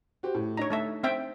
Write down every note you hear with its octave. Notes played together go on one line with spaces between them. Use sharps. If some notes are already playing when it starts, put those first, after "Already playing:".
F#4 G4 C5
A2
D4 D#4 C#5 A#5
A3 A4 E5
C4 E5 G5